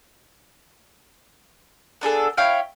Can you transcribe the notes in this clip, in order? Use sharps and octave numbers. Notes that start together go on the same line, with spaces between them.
B3 D4 G#4 A4
E4 C#5 F5 G5